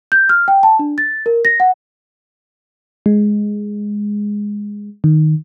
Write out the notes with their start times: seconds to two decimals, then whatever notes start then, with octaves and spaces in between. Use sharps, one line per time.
0.12 G6
0.29 F6
0.48 G5
0.63 A5
0.79 D4
0.98 A6
1.26 A#4
1.45 A#6
1.60 F#5
3.06 G#3
5.04 D#3